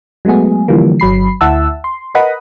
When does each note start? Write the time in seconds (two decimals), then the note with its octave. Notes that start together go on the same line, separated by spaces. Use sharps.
0.25 F#3 G#3 A3 B3 G#4
0.68 D3 E3 F3 G3 A#3
1.00 G1 F#3 B5 C7
1.41 D2 E4 E5 F#5 A5 E6
1.84 C6
2.15 A#4 B4 D#5 F#5 B5 D#6